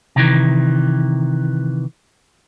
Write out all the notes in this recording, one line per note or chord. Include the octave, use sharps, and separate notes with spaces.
C3 D#3 E3